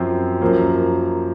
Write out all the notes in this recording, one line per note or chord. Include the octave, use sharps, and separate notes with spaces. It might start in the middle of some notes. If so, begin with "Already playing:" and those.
Already playing: F#2 F3 C4
F#2 F3 A#3